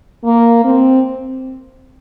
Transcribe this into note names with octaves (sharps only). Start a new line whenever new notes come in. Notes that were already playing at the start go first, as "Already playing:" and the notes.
A#3
C4